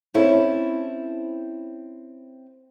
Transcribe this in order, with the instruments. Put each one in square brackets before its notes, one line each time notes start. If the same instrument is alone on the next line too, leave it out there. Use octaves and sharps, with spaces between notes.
[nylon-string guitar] C4 C#4 E4 A4